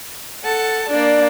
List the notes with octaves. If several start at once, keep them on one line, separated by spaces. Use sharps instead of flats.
A4 F#5 A5
A#3 D4 D5